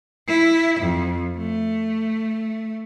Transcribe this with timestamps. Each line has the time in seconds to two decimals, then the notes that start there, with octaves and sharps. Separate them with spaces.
0.28 E4
0.80 F2
1.37 A3